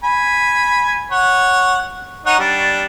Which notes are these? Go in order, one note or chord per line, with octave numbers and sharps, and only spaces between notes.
G#5 B5
C#5 F#5
D#4 C#5 F#5
G3 D4